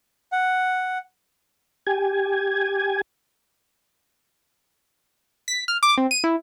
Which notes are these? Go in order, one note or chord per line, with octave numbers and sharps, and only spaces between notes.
F#5
G4 G#5
B6
F6
D6
C4
D#7
E4